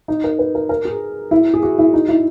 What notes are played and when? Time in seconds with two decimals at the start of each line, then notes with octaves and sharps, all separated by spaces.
0.08 D#4
0.24 A#4
0.39 B4
0.55 A#4
0.69 A#4
0.85 G#4
1.31 E4
1.54 G#4
1.63 F#4
1.78 E4
1.93 D#4
2.09 E4